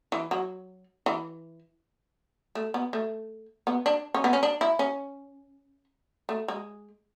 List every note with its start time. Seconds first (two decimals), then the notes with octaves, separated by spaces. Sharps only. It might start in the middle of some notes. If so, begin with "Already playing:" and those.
0.12 E3
0.31 F#3
1.06 E3
2.55 A3
2.74 B3
2.93 A3
3.67 B3
3.86 D4
4.14 C#4
4.24 B3
4.33 C#4
4.43 D4
4.61 E4
4.79 C#4
6.29 A3
6.48 G#3